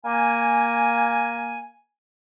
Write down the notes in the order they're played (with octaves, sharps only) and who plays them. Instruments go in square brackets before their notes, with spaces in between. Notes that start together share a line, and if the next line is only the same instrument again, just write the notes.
[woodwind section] A#3 G#5